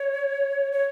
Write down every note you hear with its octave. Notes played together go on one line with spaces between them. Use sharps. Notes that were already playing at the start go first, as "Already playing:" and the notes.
Already playing: C#5
C#5